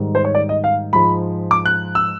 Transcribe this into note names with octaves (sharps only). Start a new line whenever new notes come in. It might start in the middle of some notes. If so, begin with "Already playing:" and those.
Already playing: G#2 D#3 G3
C5
C#5
D5
D#5
F5
G#2 F3 G#3 B5
D6
F#6
E6